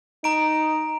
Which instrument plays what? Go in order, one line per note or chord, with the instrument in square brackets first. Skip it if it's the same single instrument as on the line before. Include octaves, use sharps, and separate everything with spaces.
[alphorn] D#4 [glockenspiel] A#5 D7